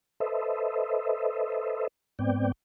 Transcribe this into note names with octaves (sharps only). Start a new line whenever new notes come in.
A4 B4 C5 D#5 E5
G#2 B3 C4 D5 G5